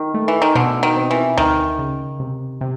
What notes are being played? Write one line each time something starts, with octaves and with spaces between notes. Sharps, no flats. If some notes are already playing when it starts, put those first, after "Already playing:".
Already playing: D#3
A3
E3
D#3
B2 D3
D#3
C4
E3
D2 D#3
C#3
C3
C3